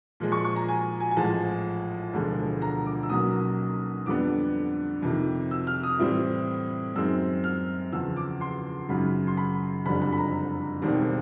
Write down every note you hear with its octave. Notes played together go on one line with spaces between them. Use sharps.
A#2 F3 G#3
C#6
C#6
A#5
G#5
G#5
G#5
A1 A2 F3 G#3 A5
E1 D2 D3 F3 G#3
A#5
D6
E6
B1 B2 F#3 A#3 C#4 D#6
F2 D3 G3 B3 D4 D6
F2 C3 D#3
E6
F6
D#6
A2 E3 G3 C4 E4
F#2 D#3 G#3 C4 E6
F6
E2 C#3 F3 E6
D6
C6
G#1 F#2 C#3 B5
C6
B5
F#1 F2 D3 G3 B5
B5
B5
A#5
E1 D#2 D#3 G3 C4